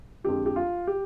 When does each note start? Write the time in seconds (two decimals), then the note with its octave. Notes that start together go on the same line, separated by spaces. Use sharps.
0.24 F2 D3 G#3 G4
0.46 G4
0.56 F4
0.87 G4